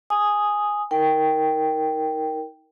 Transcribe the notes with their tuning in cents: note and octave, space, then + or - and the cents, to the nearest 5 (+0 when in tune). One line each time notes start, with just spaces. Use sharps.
G#5 +0 D#6 +0
D#4 +35 A#4 +0 G5 +0